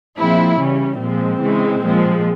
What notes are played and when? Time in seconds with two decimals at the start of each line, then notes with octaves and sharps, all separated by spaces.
0.18 A#2 F3 G#3 C4 E4
0.59 C#3 E3 G3 C#4
1.00 A#2 F3 G#3 C4
1.42 C#3 E3 G#3
1.82 A#2 F3 G#3